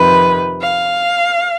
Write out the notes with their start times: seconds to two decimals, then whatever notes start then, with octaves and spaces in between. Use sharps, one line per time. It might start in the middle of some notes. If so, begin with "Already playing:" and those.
Already playing: F2 C3 D#3 B4
0.61 F5